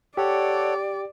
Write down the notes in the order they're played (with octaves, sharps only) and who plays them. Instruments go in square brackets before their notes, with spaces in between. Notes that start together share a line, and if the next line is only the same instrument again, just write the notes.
[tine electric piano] G4 [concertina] A4 C#5 F#5 [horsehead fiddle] D5